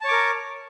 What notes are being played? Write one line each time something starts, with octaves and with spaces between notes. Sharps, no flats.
A#4 C#5 A5 D6